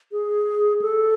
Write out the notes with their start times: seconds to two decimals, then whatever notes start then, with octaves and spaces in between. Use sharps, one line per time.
0.12 G#4
0.82 A4